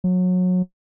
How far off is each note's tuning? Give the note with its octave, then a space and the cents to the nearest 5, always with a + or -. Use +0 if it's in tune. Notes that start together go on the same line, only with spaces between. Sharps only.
F#3 -25